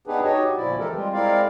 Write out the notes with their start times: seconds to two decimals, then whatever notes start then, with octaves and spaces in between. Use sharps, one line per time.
0.07 B3 D4 D#4 G4 G#4 B4
0.23 D#4 F#4 G4 C#5 D#5
0.57 D2 A#2 F3 E4 D5
0.79 E3 G#3 G4 A4 A#4
0.93 G3 G#3 C4 F4
1.14 G#3 C4 E4 A#4 D5 F5